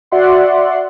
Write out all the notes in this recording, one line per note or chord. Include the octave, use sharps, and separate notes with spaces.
F#4 D5 E5 F#5 C6